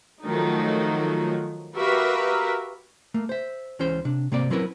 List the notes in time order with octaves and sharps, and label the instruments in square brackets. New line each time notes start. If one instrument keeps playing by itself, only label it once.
[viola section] D#3 F3 F#3 A3 D#4
F#4 G4 A#4 B4 E5 F5
[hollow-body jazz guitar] A3 A#3
C5 E5
C#2 C#3 E3 C#4 C5 C6
C3 D4
C3 A#3 C4 D5
F#3 C4 C#4 E4 A#4 B4